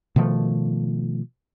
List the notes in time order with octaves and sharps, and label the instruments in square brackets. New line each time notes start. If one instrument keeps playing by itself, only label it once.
[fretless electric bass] B2 D#3 F3 A3